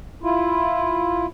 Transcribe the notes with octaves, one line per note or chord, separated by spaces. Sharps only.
E4 F4